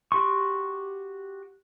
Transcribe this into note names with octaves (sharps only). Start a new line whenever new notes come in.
F#4 G4 C6 C#6